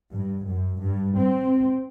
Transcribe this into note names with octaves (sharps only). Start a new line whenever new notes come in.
G2
F#2
G2
C4